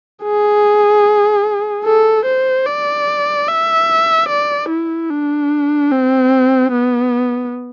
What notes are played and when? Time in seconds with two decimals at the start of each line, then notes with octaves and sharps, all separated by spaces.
0.23 G#4
1.85 A4
2.26 C5
2.66 D5
3.48 E5
4.29 D5
4.69 E4
5.10 D4
5.92 C4
6.72 B3